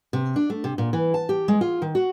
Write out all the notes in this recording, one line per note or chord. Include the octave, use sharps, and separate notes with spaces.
C3
D4
A3
C3
A#2
E3
A5
G4
G#3
F4
D#3
F#4